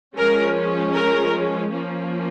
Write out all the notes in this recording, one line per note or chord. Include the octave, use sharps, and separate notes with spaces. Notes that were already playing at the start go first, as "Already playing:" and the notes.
F3 G#3 C#4 A#4
A#4
F3 A#3 C#4